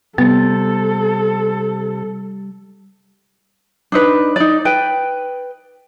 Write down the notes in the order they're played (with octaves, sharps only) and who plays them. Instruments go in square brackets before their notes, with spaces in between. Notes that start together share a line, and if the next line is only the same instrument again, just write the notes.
[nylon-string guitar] C3 [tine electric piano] G3 A6 [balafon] B3 [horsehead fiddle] A4
[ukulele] D4 D#4 B4
D#4 D5
B4 G5